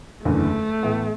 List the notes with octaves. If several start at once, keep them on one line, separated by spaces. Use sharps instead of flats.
F#1 E2 D3 A3
A2 E3 B3